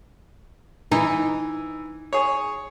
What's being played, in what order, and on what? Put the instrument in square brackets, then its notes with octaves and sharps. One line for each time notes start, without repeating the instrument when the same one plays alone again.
[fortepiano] E3 [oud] D#4
[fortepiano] G#4 C#5